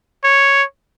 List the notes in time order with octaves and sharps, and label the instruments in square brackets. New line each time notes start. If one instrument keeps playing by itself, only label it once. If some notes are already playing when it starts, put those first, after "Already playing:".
[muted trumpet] C#5